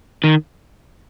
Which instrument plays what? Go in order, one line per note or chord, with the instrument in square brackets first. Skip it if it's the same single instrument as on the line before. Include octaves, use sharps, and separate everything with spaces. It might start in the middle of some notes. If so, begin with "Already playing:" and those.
[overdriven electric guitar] D#3